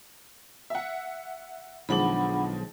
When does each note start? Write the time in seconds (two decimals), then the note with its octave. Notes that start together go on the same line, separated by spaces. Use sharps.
0.70 E5 F#5
1.89 B1 D#3 F3 G#3 D4 F#5 B5